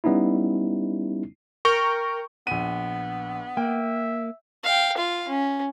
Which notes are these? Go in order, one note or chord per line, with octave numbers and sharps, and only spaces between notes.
G3 B3 C#4 D#4 E4
A#4 G5 C#6
A#1 B3 D#7
A#3 E5 G5
F5 G5
F4 F5
C#4